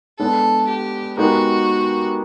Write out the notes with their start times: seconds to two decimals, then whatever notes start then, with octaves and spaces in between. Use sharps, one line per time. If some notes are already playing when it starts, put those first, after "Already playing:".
0.19 G#3 B3 D4 A4
0.68 G4
1.17 G#3 B3 D#4 F#4 G4 A#4